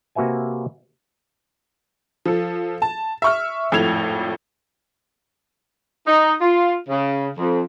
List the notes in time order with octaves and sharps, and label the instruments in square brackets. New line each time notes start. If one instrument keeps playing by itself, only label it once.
[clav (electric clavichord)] C3 A#3 F#4 B4 E5 G#5
[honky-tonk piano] F3 A4
A5
E5 C#6 F6
G#1 F2 A2 A4 G#6 F7
[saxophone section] D#4
F4
C#3
F2